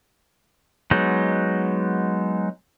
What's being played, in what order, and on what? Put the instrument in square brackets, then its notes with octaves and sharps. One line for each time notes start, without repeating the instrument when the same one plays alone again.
[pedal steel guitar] F#3 G#3 B3 D#4